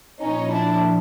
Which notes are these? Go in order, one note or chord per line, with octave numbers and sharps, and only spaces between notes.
A#2 F3 C#4 D#4
D4 E4